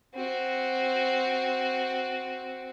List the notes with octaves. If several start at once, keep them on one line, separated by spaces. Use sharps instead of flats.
C4 F#4